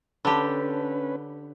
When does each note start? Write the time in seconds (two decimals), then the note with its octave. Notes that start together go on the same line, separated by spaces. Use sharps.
0.25 D3 C#4 G4 B4 A5 B5